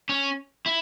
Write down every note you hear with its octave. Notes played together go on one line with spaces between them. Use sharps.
C#4
E4